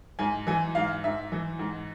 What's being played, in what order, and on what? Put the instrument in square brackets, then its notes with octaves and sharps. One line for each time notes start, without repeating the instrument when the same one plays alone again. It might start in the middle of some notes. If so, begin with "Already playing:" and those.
[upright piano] G#2 G#5
E3 G#5
G#2 F5
G#2 E5
E3
G#2